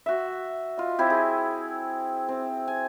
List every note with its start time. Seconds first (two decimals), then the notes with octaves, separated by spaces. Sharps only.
0.06 F#4 E5
0.78 F4 D#5
0.99 C4 E4 G4
1.10 G#4
2.29 C4
2.68 G#5